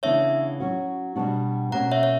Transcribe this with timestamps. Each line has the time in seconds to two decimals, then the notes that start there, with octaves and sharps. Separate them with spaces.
0.03 C#3 E3 B3 D4 C#5 E5
0.60 F#3 C#4 F#4
1.16 B2 G3 B3 D4 F#4
1.72 B2 A#3 C#4 F#5 A#5
1.91 C#5 E5
2.03 C#5